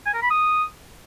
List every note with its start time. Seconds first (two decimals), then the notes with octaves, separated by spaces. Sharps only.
0.06 G#5
0.14 A#4
0.22 B5
0.31 D#6